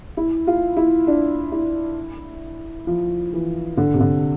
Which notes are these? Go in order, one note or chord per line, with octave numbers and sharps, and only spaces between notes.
E4
F4
E4
D4
E4
F3
E3
D3
C3
D3